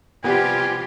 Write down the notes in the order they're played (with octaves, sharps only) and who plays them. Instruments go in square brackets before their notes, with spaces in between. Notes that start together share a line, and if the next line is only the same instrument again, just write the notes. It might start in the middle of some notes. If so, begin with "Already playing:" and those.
[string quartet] C3 F3 G3 [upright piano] B3 [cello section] F4 G4 [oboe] G#5